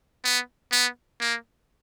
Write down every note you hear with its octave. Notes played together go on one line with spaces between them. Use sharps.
B3
B3
A#3